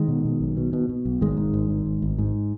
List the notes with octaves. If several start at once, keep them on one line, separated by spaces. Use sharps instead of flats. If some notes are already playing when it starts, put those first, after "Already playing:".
Already playing: D#3 G#3
B2
B2
B1
B2
B2
B2
B1
G#1 D#3 G#3
G#2
G#1
G#2
G#1
G#1
G#2